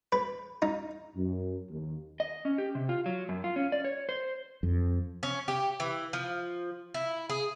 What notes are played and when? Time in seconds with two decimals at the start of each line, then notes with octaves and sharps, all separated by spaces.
0.12 B4
0.62 D#4
1.16 F#2
1.70 D#2
2.20 D#5
2.45 C#4
2.58 G4
2.75 C3
2.89 F4
3.06 F#3
3.29 F#2
3.44 F4
3.56 C#4
3.72 D5
3.85 C#5
4.09 C5
4.63 F2
5.23 C#4
5.48 G4
5.80 E3
6.13 F3
6.94 E4
7.30 G#4